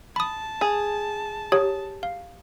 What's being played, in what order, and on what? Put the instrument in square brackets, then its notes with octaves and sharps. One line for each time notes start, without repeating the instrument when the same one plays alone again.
[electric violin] A5 [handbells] B5 D#6
[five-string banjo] G#4
[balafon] G4 [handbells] C#5
[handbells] F5